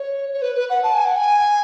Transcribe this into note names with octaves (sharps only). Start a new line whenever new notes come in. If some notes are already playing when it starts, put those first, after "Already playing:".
Already playing: C#5
C#5
B4
B4
F#5
A5
G#5
F#5
G#5